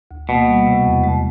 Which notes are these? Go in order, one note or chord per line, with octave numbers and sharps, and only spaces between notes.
D2
B2 A#3
G3
C3
E2
G#3